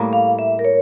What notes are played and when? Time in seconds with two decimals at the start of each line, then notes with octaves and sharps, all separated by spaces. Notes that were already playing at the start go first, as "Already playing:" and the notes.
Already playing: A2 G3 A#3
0.13 F5
0.39 E5
0.59 A#4
0.65 C#5